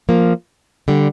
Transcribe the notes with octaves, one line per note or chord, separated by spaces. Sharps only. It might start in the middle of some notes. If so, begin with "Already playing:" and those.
F3 A#3
D3 G3